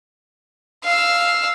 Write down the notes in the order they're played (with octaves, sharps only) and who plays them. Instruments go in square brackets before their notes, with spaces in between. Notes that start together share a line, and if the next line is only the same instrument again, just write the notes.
[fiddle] F5 E6